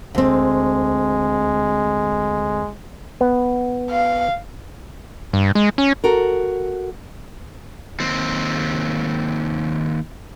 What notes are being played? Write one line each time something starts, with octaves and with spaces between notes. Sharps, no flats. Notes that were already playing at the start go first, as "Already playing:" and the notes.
D2 G#3 C4
B3
F5
G2
G#3
C#4
F#4 A4 A#4
D#2 C4